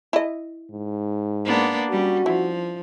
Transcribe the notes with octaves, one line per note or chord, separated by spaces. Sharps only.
E4 D#5
G#2
A#3 B3 D4
G3 C#4 F#4
F3 E4